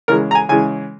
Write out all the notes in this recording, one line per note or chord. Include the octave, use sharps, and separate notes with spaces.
C#3 E3 G#3 A#4
A#5
G#5
C#3 E3 G#3 G#5